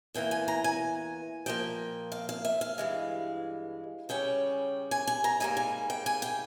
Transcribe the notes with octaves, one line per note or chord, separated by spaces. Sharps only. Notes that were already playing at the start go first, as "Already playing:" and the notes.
E2 E3 A#3 G5
G#5
A#5
G#5
A#2 F3 A#3 G5
F5
F5
E5
F5
G2 E3 G#3
C#3 G3 C#4 G5
G#5
G#5
A#5
G#2 G3 A#3 G#5
G#5
G5
G#5
G5